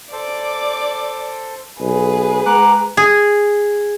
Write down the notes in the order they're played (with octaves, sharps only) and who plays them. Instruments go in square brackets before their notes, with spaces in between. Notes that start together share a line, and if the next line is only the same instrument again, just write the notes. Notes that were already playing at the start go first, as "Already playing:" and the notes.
[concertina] A4 C5 [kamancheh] D5 D6
[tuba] B1 [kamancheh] G#4 B4
[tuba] G#3 [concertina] F#5 D6 F#6 [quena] A#5
[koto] G#4